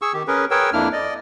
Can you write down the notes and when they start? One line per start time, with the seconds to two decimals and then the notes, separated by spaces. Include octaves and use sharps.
0.02 G#4 C#6 E6
0.14 D#3 G4
0.28 C#4 G#4 A#4 B4
0.51 G#4 A#4 B4 C#5 G5 E6
0.73 F2 A#3 D4 E4 F6
0.93 D5 D#5